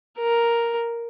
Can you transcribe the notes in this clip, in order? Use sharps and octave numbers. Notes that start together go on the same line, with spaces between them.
A#4